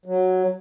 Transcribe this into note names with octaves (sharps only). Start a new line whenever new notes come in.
F#3